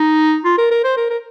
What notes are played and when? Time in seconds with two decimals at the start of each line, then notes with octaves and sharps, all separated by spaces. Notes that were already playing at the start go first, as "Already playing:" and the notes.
Already playing: D#4
0.45 F4
0.58 A#4
0.71 A#4
0.84 C5
0.97 A#4
1.10 A#4